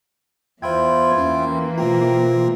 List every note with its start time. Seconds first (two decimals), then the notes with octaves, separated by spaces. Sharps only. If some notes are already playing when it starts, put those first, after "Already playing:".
0.62 E2 F4 C5 E5 G5 B5 G#6
1.18 E3 A#3 C#4
1.78 B2 A3 C4 F4 A#5